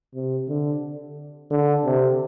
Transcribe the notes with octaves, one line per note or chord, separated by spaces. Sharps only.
C3
D3
D3
C3